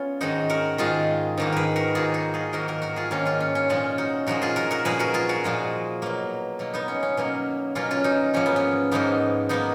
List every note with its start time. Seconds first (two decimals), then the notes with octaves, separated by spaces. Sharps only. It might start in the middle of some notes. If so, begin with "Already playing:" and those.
Already playing: B3 C#4 F4
0.21 G#2 D#3 G#3 D#4 F#4
0.50 F#4 A#4
0.78 G#2 D#3 G#3 F4 G#4
1.37 G#2 D#3 A#3
1.52 G#4 A#4 B4
1.76 F#4 A#4
1.95 G#2 D#3 A#3 F4 G#4
2.14 D#4 F#4
2.34 F4 G#4
2.53 G#2 D#3 A#3 F#4 A#4
2.68 F#4 A#4
2.82 F#4 A#4
2.96 F4 G#4
3.11 G#2 D#3 A#3 C#4 F4
3.25 C#4 F4
3.40 C#4
3.55 C#4
3.69 A#2 F3 G#3 C#4 F4
3.98 D#4 F#4
4.27 A#2 F3 G#3 F#4 A#4
4.42 F4 G#4
4.56 F#4 A#4
4.71 F#4 A#4
4.85 A#2 F3 G#3 G#4 B4
4.99 F#4 A#4
5.14 F4 G#4
5.29 F#4 A#4
5.44 A#2 F3 G#3
6.02 B2 F#3 A#3
6.59 B2 F#3 A#3
6.74 B3 D#4
6.88 C#4
7.03 C#4
7.17 B2 F#3 A#3 C#4
7.75 B2 F#3 A#3 C#4 F4
7.91 C#4 F4
8.04 D#4 F#4
8.34 G#2 F3 A#3 C#4
8.46 B3
8.56 C#4
8.91 G#2 F3 A#3 B3 D#4
9.49 F3 A#3 B3 D#4